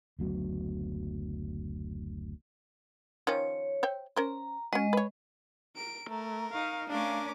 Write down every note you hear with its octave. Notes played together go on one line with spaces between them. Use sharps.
F#1 D2 F#3 B3
D#3 F3 C#4 C#5
C5 E5 G5
C#4 A#4 C5 A#5
G#3 C#4 F#4 D#5
B4 C#5
A#4 D7
A3 A#4 A#5
D#4 F5 C#6
A3 C#4 D4 A#4 F5 D6